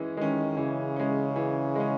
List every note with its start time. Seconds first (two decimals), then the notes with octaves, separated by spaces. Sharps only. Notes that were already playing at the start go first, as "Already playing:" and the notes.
Already playing: E3 G#3 C#4
0.17 D#3 G#3 C#4
0.57 C#3 E3
0.96 G#3 C#4
1.36 E3
1.75 G#3 C#4